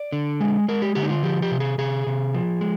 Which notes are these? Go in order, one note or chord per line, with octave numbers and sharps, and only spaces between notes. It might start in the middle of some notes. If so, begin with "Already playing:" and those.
Already playing: D5
D3
G#3
G#3 A#4
G4
D3 G4
D#4
F4
F3 G4
G4
C3
G#4
C3 G#4
C3
F3
G#3